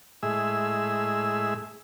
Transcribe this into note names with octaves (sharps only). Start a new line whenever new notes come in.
A2 G#3 G#4 E5 E6